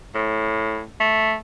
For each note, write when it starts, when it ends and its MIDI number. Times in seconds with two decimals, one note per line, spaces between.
0.15 0.82 45
1.00 1.34 57